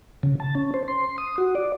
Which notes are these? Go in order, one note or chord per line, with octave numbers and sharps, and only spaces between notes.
C#3
A5
C#4
C5
C6
D#6
F#4
D5